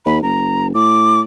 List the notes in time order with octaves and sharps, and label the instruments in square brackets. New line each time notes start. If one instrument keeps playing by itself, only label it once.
[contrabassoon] D#2 [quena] B5
[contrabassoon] F#1 [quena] A#5
[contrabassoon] A2 [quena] D6